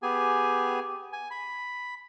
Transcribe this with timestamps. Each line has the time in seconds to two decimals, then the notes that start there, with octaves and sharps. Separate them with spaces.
0.03 B3 G4 G#4 G#5
1.13 G#5
1.31 B5